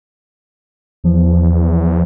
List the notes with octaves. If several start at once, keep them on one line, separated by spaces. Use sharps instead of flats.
E2 F3